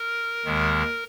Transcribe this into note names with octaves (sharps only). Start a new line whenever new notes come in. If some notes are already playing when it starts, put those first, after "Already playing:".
Already playing: A#4
D#2 D#3 G#3